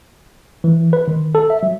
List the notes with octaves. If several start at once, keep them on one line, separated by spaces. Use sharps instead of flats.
E3
B4
D#3
A4
E5
F#3